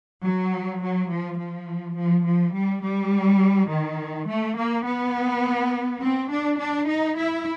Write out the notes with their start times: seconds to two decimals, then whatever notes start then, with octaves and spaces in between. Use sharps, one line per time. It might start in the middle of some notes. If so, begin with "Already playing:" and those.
0.24 F#3
0.82 F#3
1.11 F3
1.39 F3
1.97 F3
2.26 F3
2.55 G3
2.83 G3
3.70 D#3
4.28 A3
4.57 A#3
4.86 B3
6.01 C4
6.31 D4
6.60 D4
6.88 D#4
7.17 E4